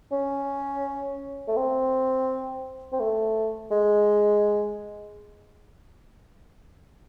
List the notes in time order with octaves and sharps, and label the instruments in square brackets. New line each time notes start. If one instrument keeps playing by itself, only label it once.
[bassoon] C#4
A3
C4
C4
A3
G#3